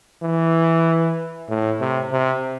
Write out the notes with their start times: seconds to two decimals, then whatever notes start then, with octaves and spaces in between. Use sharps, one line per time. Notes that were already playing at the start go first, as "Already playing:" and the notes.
0.23 E3
1.49 A2
1.80 C3
2.12 C3